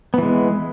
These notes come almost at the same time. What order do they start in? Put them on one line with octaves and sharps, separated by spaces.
B3 E3 G#3